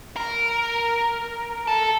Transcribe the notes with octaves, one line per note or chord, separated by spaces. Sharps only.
A#4
A4